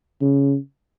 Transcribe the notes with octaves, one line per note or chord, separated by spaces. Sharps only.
C#3